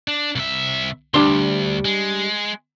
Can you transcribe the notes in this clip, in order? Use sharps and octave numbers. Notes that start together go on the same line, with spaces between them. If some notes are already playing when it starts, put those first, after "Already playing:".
D4
C2 E5
D2 G3 D4 C6
G#3